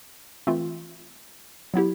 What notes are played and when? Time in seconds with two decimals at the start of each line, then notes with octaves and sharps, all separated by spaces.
0.47 E3 A3 C4 F4
1.74 F#3 B3 E4 G4